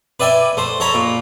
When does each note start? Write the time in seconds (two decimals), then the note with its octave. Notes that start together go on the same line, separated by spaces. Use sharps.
0.20 B4 D5 E5 G5 G#5
0.57 A3 C5
0.80 A4 C#5 A#5 B5
0.94 A#2